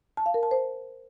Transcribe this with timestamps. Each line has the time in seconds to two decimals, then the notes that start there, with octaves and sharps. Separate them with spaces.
0.17 A5
0.26 F5
0.34 A#4
0.43 A5
0.51 C5